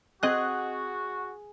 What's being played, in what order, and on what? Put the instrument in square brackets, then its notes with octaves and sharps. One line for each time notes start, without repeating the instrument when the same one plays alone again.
[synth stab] C4 D#5 F#6 [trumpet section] F#4 [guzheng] G#4